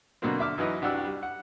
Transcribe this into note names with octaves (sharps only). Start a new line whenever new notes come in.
B2 D3 F#3 A#3 C4
D3 E5 D6 F6
F#2 E3 F#3 D#4 B4 D#5
C2 D4 F#4 G4 F#5 E6
G3
F#5